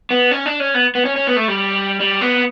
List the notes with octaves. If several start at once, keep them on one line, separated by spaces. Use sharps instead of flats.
B3
C#4
D4
C#4
B3
B3
C#4
C#4
B3
A3
G3
G3
B3